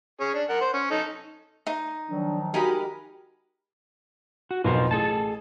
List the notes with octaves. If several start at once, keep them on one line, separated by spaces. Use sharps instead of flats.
C#4 G#4
D4
A#4 F#5
C5
C#4
D#4 A4
D#4
D#3 F3 F#3 D4
G#3 D#4 F#4 G4 A#4 B5
F#4
B1 F2 B2 F4 A#4 C5
A1 G#4 A4 A5